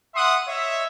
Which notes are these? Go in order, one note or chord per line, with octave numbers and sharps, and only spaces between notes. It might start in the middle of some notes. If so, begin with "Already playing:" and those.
E5 F#5 C6 D#6
C#5 D#5 E5